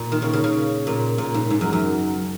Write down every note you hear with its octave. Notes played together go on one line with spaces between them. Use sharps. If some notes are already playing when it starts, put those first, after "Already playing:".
Already playing: A#2
D#3
C#3
C#3
C#3
A#2
A#2
G#2
G#2
F#2
F#2